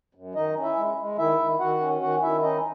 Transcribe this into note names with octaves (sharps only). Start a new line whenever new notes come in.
F#2
D#3 D#4 D#5
C#4
E4 E5
G#3
G#3
D#3 E4 E5
D#3
D#3 F#4 F#5
C#4
D#3 F#4 F#5
D#3 E4 E5
C#4 D#4 D#5